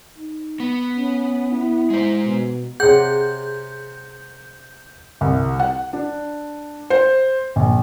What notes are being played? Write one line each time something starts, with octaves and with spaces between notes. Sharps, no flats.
D#4
B3
C#4
E4
G#3 C5
B2
C3 G#4 C#5 F#5 G6
C2
F#5
D4
C5
A#1